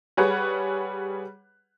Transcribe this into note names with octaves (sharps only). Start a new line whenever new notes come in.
G3 G#4 B4 C#5 F#5 F#6